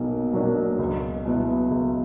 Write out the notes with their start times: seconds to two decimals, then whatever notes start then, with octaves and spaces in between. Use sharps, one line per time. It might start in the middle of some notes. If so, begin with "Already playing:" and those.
Already playing: B1 B2 F#3 A#3
0.33 B2 F#3 A#3 D4
0.79 C#2
1.25 B2 F#3 B3 E4
1.71 C#2